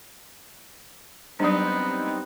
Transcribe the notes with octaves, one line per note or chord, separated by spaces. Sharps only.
F#3 G3 B3 C4 D4 D#4